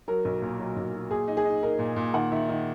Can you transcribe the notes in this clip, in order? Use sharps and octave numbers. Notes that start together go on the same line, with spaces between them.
F#3 A#4
B1
A#2
F#3
B1
F#3
A#2 G#4
D#4
G#4
D#4
D#4 A#4
A#2
A#2
D#3 F#5
D#3 E5
D#3 D#5